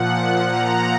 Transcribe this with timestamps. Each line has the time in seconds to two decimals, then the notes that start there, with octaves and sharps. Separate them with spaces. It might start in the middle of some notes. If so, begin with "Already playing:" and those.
Already playing: A#2 F3 F#5
0.48 A#5